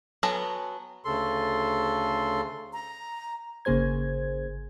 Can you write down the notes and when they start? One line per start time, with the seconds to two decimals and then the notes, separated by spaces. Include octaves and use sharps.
0.23 F#3 B3 A4 G#5 A#5
1.05 D2 C#3 A4 C6
2.73 A#5
3.65 G#1 C#3 A#3 G#4 C5 G#6